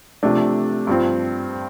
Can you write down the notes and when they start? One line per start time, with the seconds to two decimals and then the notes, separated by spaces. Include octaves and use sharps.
0.23 C3 F3 A3 D4
0.87 G2 F3 C4